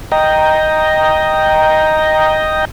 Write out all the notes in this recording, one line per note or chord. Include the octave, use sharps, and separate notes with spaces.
D#5 G5 A#5